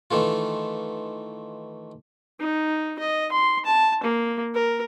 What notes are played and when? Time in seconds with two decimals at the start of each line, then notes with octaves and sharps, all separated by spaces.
0.11 D#3 E3 A3 F4
2.40 D#4
2.99 D#5
3.32 C6
3.66 A5
4.03 A#3
4.54 A#4